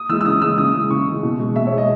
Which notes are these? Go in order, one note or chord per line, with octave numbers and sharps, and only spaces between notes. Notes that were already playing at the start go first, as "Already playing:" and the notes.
Already playing: D#6
E3 G#3 E6
E6
C#3 D#6
E3 G#3 E6
C#3 D#6
E3 G#3
C#3 C#6
E3 G#3
B2
G#3
B2 E5
C#5
G#3
D#5